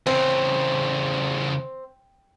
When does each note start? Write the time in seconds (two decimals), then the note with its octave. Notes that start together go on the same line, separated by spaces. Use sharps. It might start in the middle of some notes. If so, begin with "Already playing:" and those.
0.07 E2 C#3 C4